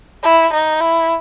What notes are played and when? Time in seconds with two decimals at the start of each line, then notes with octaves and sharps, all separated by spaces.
0.23 E4
0.53 D#4
0.80 E4